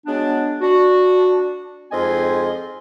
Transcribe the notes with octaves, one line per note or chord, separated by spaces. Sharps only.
F#3 G#3 B3 D4
D4 F#4
F2 G#2 C4 D#5 G#5 C6